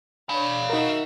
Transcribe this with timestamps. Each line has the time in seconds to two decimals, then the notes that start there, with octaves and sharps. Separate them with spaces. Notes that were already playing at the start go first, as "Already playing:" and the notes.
0.29 D4 C#5 F5 B5
0.70 D#4 F#4 A#4 E5